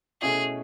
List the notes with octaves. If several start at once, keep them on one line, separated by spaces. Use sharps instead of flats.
B2 A3 C#4 E4 G#4